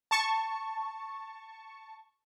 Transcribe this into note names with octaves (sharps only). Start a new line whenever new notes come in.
A5 C#6